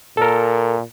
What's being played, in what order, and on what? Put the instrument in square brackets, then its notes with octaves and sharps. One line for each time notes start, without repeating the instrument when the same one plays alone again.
[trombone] A#2 [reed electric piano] A4 A#4